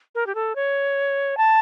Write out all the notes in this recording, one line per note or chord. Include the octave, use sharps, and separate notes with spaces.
A#4
G4
A4
C#5
A5